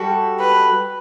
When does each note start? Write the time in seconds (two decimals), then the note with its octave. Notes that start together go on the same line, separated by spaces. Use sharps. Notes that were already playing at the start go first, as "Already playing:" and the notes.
Already playing: G3 F#4 A4
0.40 B4